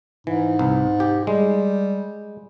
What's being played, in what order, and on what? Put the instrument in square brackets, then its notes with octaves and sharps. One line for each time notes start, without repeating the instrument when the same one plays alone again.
[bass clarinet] G#2 [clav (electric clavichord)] E3
[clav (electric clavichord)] C2
G4
[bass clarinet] G3 [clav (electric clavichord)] G#3